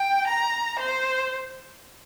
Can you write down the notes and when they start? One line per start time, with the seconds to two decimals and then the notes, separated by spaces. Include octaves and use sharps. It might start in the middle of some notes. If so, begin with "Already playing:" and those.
Already playing: G5
0.27 A#5
0.79 C5